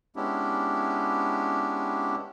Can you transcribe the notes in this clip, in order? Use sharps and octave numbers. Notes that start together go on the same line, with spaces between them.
G#3 B3 C#4 D4 E4 G4